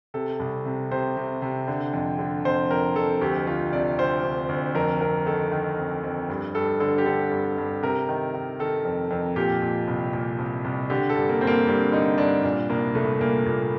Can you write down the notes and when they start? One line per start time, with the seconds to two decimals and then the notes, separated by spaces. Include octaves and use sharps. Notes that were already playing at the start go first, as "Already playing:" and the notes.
0.14 C3 A4
0.40 C2
0.66 C3
0.91 C3 C5
1.17 C3
1.42 C3
1.68 D3
1.93 F2
2.19 D3
2.45 F2 C5
2.71 F2 A#4
2.96 F2 A4
3.21 D2 G4
3.47 D2 F4
3.73 C3 D5
3.98 D2 C5
4.24 D2
4.49 D2
4.75 F2 A#4
5.01 F2 A#4
5.26 D#3 A4
5.52 D#3
5.78 F2
6.04 F2
6.29 G2
6.55 G2 A4
6.80 D3 A4
6.98 G4
7.06 D3 A4
7.31 G2
7.58 G2
7.82 C3 A#4
8.09 D#3
8.34 D#3
8.60 D#3 A4
8.85 F2
9.11 F2
9.36 A#2 G4
9.62 A#2
9.88 C2
10.13 A#2
10.39 C2
10.65 C2
10.90 D3 G4
11.10 A4
11.16 G2
11.29 A#3
11.41 G2 C4
11.47 A#3
11.66 G2 C4
11.92 D3 D#4
12.18 G2 D4
12.43 A#2 D4
12.70 C2 A#3
12.95 C2 A3
13.21 A#2 A#3
13.46 A#2